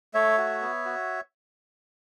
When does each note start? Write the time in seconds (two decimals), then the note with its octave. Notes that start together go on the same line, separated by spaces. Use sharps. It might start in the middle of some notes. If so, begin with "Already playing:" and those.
0.14 A3 C#5 E5
0.38 F#4
0.61 B3
0.85 F#4